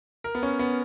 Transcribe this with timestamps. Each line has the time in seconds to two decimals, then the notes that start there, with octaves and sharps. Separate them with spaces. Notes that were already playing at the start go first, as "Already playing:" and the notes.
0.24 A#4
0.35 B3
0.43 C#4
0.59 B3